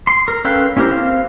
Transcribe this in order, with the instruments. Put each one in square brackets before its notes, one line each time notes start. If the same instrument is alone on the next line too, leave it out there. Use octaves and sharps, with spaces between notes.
[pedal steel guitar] C6
A#4
C#4 A4 B4 F5 G5
C#4 E4 G4 A#4 C5
C4 F5